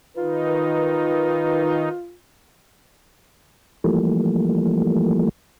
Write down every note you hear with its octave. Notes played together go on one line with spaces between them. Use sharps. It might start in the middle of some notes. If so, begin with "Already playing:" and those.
D#3 D#4 F4 B4
E3 F3 G3 A3 A#3